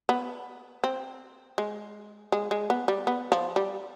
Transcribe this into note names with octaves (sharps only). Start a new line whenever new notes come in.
B3
C4
G#3
G#3
G#3
B3
G3
B3
F3
G3